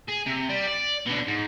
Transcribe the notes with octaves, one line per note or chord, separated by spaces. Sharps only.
G#4
C3
G3
D5
B2 D3
G#2